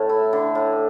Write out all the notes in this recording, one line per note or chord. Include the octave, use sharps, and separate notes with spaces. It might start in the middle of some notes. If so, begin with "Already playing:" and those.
Already playing: A2 A3
E4
D3
A2